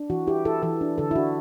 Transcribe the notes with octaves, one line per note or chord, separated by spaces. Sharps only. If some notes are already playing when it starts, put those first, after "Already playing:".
Already playing: D4
E3 F#4
E4 G4
E4 A4
E3 A4
D4
D3 A4
E4
D4 F#4